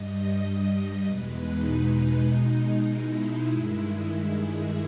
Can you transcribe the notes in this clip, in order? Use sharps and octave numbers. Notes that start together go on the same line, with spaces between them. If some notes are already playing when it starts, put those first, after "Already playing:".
Already playing: G2 G3 D#5
E2 B2 G#3 B4
D#4
B2 G#3
E4
G2 D#3 G#3
G#4
G#4